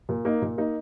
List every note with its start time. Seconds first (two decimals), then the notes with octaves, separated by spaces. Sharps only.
0.09 A#2
0.25 A#3 D#4
0.42 A#2
0.58 A#3 D#4